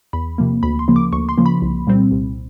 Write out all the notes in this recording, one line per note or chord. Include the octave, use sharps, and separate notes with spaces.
E2 B5
C3 F3 A#3
D2 B5
C6
C#3 F3 A#3
D6
D2 C#6
C6
C#3 F3 A#3
B5
C2
A#2 G3 C4
C2